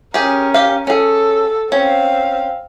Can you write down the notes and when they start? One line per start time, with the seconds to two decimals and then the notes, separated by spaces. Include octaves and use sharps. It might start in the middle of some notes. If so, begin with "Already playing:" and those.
0.14 C#4 G4 G#4 A#4
0.54 G4 F5
0.87 C#4 G#4 A4
1.72 C4 C#4 F5